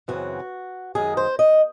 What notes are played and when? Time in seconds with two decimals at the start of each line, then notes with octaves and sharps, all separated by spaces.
0.08 F#2 C#3 E3 C4 F#4
0.95 F#2 D#3 G#3 G#4
1.17 C5
1.39 D#5